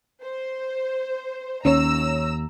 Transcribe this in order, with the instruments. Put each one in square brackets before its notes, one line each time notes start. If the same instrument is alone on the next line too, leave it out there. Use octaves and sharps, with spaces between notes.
[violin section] C5
[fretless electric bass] D#2 [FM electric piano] C#4 C#5 [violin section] A#5 E6